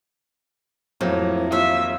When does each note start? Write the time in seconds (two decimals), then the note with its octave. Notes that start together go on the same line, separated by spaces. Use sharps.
1.01 F2 A2 F3 F#3 A#3
1.52 D#2 F4 E5 F5